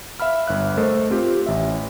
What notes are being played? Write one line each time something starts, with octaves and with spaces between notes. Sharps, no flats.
E5 F5 B5 F6
G1 E5 F#6
A3 A4 A#4 C5 D#5
C4 F4 G4
A1 E5